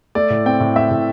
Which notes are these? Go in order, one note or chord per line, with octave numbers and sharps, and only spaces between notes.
A3 D5
A2
C4 G5
A2
A3 E5
A2